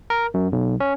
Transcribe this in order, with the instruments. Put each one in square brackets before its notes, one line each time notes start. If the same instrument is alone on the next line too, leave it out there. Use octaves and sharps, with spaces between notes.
[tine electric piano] A#4
F#2
B1
C#4